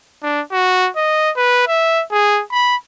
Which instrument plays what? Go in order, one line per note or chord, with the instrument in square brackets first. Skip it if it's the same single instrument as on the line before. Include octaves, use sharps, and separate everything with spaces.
[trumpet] D4
F#4
D#5
B4
E5
G#4
B5